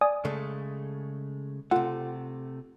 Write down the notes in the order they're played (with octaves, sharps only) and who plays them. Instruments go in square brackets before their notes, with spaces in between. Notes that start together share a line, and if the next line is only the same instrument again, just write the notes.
[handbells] D5 G#5 D#6
[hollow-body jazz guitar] C#3 G#3 A3
[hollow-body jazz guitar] C3 A3 [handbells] F4 F#5